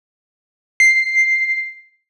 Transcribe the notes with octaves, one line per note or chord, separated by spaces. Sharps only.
C7